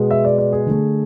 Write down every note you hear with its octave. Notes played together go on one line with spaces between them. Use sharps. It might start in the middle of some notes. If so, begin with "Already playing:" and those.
Already playing: B2 G#3 B3
E5
D5
D5
G#4
D3 A3